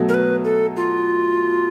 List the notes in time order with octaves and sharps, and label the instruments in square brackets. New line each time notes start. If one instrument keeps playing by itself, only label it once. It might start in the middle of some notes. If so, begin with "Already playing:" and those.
Already playing: [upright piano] B2 F#3 A3
[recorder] A#4
B4
A4
F4